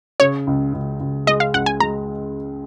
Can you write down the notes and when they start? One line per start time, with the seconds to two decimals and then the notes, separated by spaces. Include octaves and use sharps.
0.20 C#3 C#5
0.47 C#2
0.74 C#2
1.00 C#2
1.27 G#3 D#5
1.40 F5
1.54 C#2 F#5
1.66 G#5
1.80 G#3 A#5